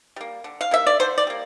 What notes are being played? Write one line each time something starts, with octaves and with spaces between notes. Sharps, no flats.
G3 A#3
D3
F5
G3 A#3 E5
D5
D3 C5
D5
G3 A#3